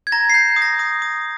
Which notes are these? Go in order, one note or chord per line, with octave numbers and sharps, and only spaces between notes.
G#6
A#5 A#6
C7
G6
D#6
A#6
D#6
D#6